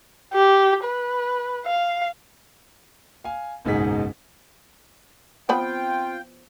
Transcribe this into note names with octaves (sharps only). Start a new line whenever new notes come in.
G4
B4
F5
F5 G#5
F#1 B1 G#2 D#4 G#4 B6
F3 B3 C4 F4 G5 B5